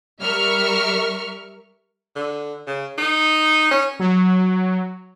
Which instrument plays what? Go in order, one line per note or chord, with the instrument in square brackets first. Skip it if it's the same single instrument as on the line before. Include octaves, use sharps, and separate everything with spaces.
[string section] G3 A#4 E5 C#6 F6
[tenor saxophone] D3
C#3
D#4
C#4
[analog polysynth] F#3